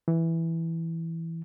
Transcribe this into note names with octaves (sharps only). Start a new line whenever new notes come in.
E3